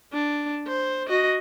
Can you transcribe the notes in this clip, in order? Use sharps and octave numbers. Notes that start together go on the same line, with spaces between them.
D4
C5
F#4 D#5